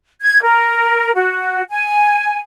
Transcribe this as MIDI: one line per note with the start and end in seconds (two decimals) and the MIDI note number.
0.21 0.42 92
0.42 1.11 70
1.15 1.62 66
1.70 2.38 80